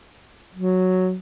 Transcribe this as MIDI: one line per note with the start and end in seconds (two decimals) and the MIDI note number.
0.55 1.17 54